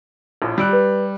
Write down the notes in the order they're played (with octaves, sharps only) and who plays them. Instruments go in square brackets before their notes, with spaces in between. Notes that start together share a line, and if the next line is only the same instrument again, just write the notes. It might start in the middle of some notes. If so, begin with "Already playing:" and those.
[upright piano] A#1 A2
[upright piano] G3 F#6 [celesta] B5 E6 D7
[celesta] G4 B4